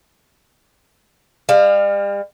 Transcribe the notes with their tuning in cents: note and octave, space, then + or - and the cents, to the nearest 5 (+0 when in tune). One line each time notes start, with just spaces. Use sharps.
G3 +40 F5 +0